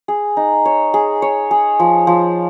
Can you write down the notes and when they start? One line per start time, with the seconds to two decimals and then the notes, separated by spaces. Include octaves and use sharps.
0.08 G#4
0.37 D#4
0.65 C#5
0.94 G#4
1.22 C#5
1.51 G#4
1.80 F3
2.07 F3